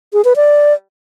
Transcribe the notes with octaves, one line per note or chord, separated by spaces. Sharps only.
G#4
B4
D5